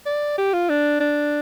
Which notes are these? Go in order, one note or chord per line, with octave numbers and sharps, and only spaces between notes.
D5
G4
F4
D4
D4